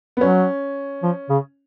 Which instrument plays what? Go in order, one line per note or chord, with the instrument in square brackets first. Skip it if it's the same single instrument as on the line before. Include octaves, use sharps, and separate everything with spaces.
[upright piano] B3
[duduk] F#3 [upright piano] C#4
[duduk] F3
C#3